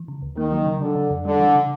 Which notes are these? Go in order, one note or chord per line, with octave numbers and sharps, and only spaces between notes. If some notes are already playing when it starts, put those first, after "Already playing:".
Already playing: E3
C#3
D2
D#3 A#3
F#3
C#3
D3 F#3
C#3
F2
D3 G3
E3
C#3